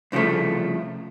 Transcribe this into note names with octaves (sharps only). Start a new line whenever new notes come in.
C2 C#3 E3 F3 A3